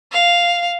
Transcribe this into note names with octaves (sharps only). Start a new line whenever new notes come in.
F5